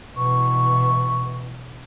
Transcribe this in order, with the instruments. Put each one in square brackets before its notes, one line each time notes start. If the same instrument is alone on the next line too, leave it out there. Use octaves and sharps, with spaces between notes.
[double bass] B2 E3 [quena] C#6